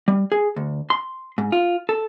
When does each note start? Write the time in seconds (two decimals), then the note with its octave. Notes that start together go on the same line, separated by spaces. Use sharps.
0.08 G3
0.32 G#4
0.56 D2
0.90 C6
1.38 G#2
1.52 F4
1.89 A4